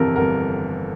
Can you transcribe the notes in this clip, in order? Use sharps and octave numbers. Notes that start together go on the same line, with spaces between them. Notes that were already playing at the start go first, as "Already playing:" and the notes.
Already playing: G1 F2 C3 E3 A4 A#4
G1 A#4